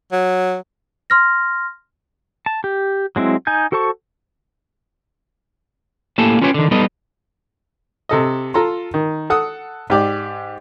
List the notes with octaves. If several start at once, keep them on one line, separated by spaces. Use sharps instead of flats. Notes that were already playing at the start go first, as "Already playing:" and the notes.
F#3
C6 F6 A#6
A5
G4
F#3 G#3 C4 E4
D#4 G#5 G6
F#4 A4 C5 A5 C#6
A2 A#3 G4 A4 G#5 A5
C#4 F4 G4 B4 C#5 G5
D3 D#3
G3 B3 D#4 A4 B4 D#5
C3 A4 D#5
F4 A4 A#5 C6
D#3
A4 F#5 D#6
G#2 G4 D5